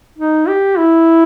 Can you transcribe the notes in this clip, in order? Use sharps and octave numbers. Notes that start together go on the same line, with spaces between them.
D#4
G4
E4